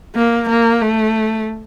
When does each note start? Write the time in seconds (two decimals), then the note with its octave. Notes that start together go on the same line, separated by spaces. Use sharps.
0.16 A#3
0.49 A#3
0.82 A3